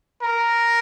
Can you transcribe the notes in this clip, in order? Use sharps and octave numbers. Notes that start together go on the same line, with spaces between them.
A#4